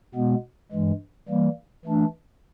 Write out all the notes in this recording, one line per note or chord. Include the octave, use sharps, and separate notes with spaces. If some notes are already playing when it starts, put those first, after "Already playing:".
B2 G#3 B3
G2 E3 G#3
E3 G3 A#3
E3 A3 D4